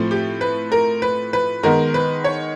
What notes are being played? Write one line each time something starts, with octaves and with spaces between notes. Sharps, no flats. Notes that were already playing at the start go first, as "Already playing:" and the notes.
Already playing: A2 F3 A3 C4
G4
B4
A#4
B4
B4
D#3 G#3 B3 A#4
B4
C#5